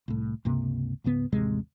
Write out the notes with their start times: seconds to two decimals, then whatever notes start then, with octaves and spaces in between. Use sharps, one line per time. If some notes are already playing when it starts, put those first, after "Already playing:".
0.08 C2 A2
0.45 C#2 G2 C3 A#3
1.04 C#2 G#2 C#3 B3
1.32 A1 D#2 C3 G#3